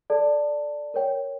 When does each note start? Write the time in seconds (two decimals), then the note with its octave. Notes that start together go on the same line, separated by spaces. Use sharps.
0.10 A4 D5 A5
0.94 A#4 C#5 G5